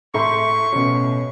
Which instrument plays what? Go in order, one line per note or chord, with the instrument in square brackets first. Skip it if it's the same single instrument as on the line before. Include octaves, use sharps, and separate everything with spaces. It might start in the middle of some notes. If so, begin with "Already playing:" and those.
[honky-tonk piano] A2 [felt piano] E5 A#5 C6 [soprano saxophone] C#6
[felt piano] B2 C#4